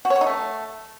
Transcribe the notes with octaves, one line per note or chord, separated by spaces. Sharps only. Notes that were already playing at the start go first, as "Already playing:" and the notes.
F#4
C#5
F#4
D#4
A3